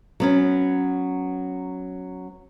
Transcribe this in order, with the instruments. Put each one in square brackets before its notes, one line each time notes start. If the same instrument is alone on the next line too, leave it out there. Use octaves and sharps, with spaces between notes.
[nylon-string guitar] F#3 B3 C#4